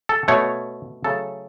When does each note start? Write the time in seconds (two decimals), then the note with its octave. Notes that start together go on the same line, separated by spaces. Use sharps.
0.09 A4
0.28 B2 A3 C#5
1.04 C#3 F#3 A3 A4